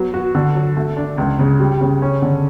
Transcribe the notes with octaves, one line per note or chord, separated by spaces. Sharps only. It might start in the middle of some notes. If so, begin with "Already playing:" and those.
Already playing: F#3 B3
F#4
D3
F#3
A3
D4
C#2
C#3
G3
C#3
C#4
D3